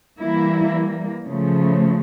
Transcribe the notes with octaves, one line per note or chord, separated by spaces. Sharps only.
E3 G3 A#3 E4
C#3 F3 A3